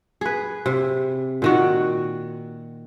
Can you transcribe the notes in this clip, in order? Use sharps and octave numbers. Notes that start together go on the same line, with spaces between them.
G#4 B4
C3
A#2 D#3 F#4